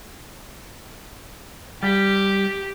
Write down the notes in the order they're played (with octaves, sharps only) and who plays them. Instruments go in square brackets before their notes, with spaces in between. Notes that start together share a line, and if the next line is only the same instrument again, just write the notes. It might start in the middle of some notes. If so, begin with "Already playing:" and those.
[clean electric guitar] G3 [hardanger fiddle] G4